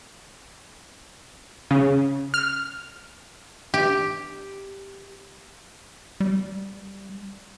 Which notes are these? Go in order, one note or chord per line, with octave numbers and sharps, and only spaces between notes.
C#3
F6
G4
G3